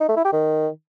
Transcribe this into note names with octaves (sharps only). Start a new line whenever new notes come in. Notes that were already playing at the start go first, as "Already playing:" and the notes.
D#4
A3
E4
G4
D#3